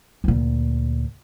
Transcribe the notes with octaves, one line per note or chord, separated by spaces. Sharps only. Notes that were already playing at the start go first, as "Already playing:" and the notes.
D2 A#2